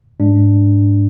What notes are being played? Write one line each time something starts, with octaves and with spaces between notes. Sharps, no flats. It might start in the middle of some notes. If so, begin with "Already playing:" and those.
G#2 G#3 D4